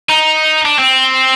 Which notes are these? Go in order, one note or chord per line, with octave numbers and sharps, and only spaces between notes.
D#4
D4
C4